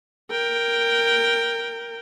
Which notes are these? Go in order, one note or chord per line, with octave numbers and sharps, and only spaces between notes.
A#4 G5